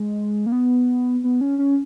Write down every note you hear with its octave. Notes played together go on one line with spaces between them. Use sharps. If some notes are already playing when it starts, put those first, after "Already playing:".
Already playing: G#3
A#3
B3
B3
C#4
C#4